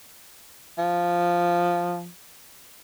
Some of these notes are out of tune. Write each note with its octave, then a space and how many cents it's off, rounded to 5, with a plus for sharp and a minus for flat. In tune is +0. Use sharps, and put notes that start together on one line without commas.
F3 +0